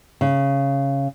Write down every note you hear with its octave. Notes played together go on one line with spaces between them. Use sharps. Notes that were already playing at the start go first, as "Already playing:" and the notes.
C#3